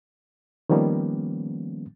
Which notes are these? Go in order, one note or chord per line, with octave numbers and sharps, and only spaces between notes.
D#3 F3 G3 A#3 B3 C#4